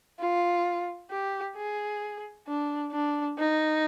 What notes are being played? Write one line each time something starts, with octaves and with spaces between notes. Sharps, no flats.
F4
G4
G#4
D4
D4
D#4